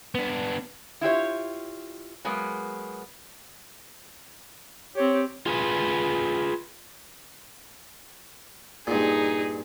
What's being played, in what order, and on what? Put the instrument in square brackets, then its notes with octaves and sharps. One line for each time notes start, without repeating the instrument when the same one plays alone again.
[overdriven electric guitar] B3 D4
[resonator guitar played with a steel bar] E4 F4 G4 C#5
F#3 G#3 A#3 B3
[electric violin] C4 G4 [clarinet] C#5
[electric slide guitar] F4 G#4 B4
[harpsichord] G2 A#2 [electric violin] D#4 G#4